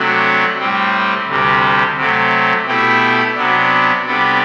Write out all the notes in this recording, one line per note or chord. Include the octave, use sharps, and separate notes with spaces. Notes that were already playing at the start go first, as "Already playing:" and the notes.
Already playing: C3 F#3 A3 D4 F#4
A2 G3 C4
D2 C3 G3
C3 F#3 A3
B2 A3 E4 G4
C3 F#3 B3 D4
C3 G3 B3 D4 A4